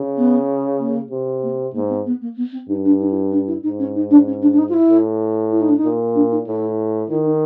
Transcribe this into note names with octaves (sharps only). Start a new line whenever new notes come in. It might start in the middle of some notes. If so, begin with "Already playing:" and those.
Already playing: C#3
B3
A#3
C3
A#3
G#2 A#3
C4
B3
A#3
B3
C4
G2 D#4
D4
D#4
E4
D4
E4
G#2 D#4
C#4
D#4
D4
C#4
D4
D4
D#4
F4
E4
A2
E4
D#4
D4
D#4
A#2
D4
D#4
A2 E4
D#3 E4
D#4